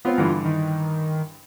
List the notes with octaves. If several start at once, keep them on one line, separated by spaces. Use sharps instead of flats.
B3 C4 F4
G2 D3 E3
D#3